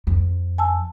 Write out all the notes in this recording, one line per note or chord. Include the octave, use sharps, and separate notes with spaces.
F2
G#5 A5 E6